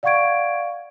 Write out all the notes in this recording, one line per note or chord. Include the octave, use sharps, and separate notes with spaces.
D5 F5 F#5 C#6 G#6 D7